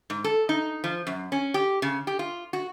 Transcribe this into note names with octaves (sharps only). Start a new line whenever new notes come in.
G#2
A4
D#4
F3
F#2
C#4
G4
C#3
G4
F4
F#4